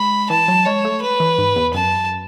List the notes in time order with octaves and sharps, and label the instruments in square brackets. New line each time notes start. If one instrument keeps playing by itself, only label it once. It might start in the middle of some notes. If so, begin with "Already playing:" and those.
Already playing: [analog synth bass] G#3 [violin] B5
[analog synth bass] E3 [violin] A5
[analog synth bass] F#3
[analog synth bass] G#3 [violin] C#5
[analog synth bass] A3
[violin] B4
[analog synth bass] E3
G#2
E2
[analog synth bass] F#2 [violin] A5